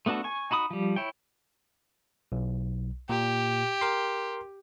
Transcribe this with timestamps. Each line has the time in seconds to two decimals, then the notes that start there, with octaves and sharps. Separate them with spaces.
0.06 A3 B3 D4 F#4 A4
0.24 G#5 C#6
0.51 D#4 F#4 B5 D#6
0.70 F3 G3
0.96 E4 C#5 G5
2.32 B1
3.09 A#2 G4
3.81 A#4 C6